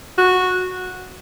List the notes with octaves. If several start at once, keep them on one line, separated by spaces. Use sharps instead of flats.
F#4